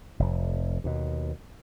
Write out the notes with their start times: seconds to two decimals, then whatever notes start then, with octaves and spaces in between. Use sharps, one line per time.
0.19 F1 F2
0.84 D#2 B2